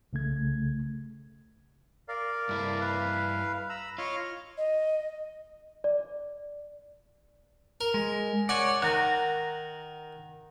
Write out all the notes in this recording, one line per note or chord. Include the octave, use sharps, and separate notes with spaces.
C2 C#3 A3 G#6
A#4 D5 F5
G2 E4
B4 F5
A#5 B5 E6
F4 C#5 D#5 F6
D#5
D5
A#4
G#3
C#5 D5 F#5 G#5
D#3 F#5 A#5